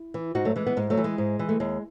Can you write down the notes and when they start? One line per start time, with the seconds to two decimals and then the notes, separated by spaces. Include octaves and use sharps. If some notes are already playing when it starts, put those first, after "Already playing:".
Already playing: E4
0.14 E3
0.35 G#2 D#4 F#4
0.45 F#3 A3
0.56 E3 G#3
0.66 G#3 B3
0.77 G#2 G#3
0.90 F#3 A3
0.97 E3
1.04 G#3
1.18 G#2
1.39 E3
1.49 A3
1.60 D#2 G#3